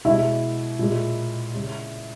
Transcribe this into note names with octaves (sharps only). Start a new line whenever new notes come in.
B2 G#3 E4
A#2 G#3
C#3 G#3